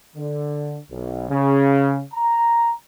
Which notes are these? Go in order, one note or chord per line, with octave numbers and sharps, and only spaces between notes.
D3
B1
C#3
A#5